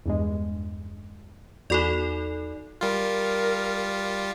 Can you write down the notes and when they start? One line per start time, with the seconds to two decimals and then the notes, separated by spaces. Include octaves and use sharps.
0.06 E2 G2 G#3
1.70 E2 D#4 F#4 A4 D5 B5
2.81 G3 F4 A#4